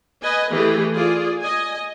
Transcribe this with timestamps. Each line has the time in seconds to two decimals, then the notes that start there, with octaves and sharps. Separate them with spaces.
0.22 B4 D#5 G#5
0.52 E3 A3 G4 G#4
0.96 F4 G#4 D5
1.41 D#5 G#5